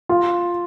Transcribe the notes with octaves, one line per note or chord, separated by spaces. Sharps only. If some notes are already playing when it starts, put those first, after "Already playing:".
F4